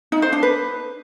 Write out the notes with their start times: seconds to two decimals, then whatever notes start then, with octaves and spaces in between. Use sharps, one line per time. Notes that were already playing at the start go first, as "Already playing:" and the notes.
0.12 D#4
0.22 C5
0.32 D4
0.43 B4